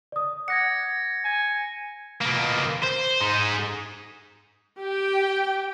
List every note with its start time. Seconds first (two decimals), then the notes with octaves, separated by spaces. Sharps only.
0.12 D5 D#6
0.48 F#5 D6 F#6 G#6 A#6 C#7
1.24 G#5
2.21 B2 A#3
2.82 C5
3.21 G#3 D#4
4.80 G4 G5